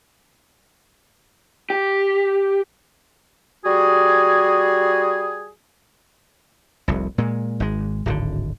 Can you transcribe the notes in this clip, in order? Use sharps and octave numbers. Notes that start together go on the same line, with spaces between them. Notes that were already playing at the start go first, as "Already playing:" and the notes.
G4
G3 F#4 G#4
F1 C2
A#2 G#3
G#1 G#3
D1 G#1 D3